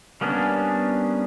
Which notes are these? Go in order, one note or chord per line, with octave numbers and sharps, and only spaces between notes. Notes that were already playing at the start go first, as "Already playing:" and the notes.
G3 A#3 B3 C#4 D4